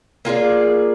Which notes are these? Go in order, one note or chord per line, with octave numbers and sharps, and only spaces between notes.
A#3 F4 G#4 D5